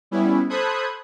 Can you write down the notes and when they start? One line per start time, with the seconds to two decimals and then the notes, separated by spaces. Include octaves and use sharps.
0.11 G3 B3 C#4 E4
0.49 A4 C5 B5 D#6 F#6 G#6